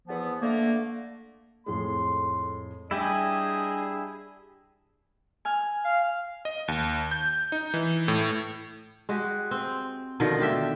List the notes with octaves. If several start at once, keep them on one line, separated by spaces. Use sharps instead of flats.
E2 F3 B3
D3 A3 A#3
F2 A2 G#3 C6
G3 D4 E4 G4 G#4 D#5 G#5
G#5 F6
F5
D#5
D#2
G6
D#4
E3
A2
G#3 F#4 G4
C4
B2 D3 D#3 F3
F4 G4 E5